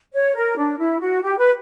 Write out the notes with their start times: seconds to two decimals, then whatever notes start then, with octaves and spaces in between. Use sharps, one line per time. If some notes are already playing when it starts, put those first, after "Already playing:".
0.14 C#5
0.35 A#4
0.57 D4
0.78 E4
1.00 F#4
1.22 G4
1.38 B4